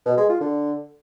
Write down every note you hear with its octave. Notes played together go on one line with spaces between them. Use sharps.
B2
G#3
F4
D3